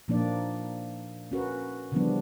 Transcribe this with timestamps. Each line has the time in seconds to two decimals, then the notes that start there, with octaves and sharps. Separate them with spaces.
0.08 A#2 F3 A#3 D4 D#4 D5
1.31 C#4 F#4 A#4 B4
1.92 C#3 E3 F3 G3 B3 D4